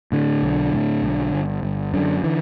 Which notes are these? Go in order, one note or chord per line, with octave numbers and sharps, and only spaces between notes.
A2 D3
B1
A2
B1
G1
G1
F#2 D3
D3 E3